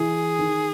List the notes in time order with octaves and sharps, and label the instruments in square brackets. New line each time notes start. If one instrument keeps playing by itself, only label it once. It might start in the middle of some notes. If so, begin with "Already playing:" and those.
Already playing: [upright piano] E3 [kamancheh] G#4
[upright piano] D#3